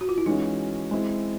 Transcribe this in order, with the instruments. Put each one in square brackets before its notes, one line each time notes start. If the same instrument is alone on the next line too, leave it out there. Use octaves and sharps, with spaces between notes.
[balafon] F#4
F4
E4
[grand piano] E3 G#3 C#4 F#4 [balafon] D#4
[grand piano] G#3 C4 E4